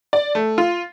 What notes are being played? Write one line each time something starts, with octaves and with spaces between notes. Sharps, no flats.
D5
A3
F4